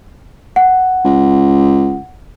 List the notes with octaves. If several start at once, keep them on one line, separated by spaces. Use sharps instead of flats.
F#5
C#2